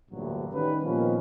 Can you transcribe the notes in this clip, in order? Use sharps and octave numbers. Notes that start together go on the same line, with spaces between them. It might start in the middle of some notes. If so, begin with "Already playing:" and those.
A1 D2 G2 A#2 D3 F#3
D#3 G3 C#4 D#4 B4
A#2 D#3 F3 B3 C#4